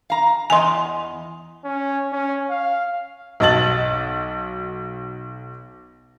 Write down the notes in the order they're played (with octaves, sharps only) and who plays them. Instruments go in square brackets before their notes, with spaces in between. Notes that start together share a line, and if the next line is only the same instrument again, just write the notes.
[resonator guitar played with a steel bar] F5 A#5
[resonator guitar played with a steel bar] E2 D#5 [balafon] G#5 C6
[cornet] C#4
C#4
F5
[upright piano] B1 F#4 D#5 A5 A6 F#7